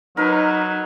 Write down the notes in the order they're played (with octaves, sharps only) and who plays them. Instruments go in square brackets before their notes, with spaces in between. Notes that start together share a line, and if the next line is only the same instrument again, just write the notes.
[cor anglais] F#3 [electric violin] D#4 [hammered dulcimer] A#4 B4